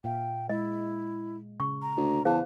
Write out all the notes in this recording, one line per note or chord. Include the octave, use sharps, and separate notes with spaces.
A#2 E5 F5 G5
G#3 E4 D#5
C#3 C#6
A#5
D2
E2 G#4 C5 F5 A5